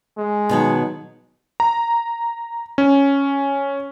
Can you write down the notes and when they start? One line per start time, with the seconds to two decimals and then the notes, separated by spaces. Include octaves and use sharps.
0.17 G#3
0.49 B2 D#3 F#3
1.60 A#5
2.78 C#4